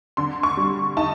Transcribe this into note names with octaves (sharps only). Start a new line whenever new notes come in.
D3 C6
C#6
G3
D#4 A5